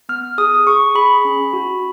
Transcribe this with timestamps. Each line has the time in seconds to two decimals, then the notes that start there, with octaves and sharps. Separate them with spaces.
0.09 B3 F6
0.38 G#4 D#6
0.67 G#4 C#6
0.95 G#4 B5
1.25 C#4
1.53 F#4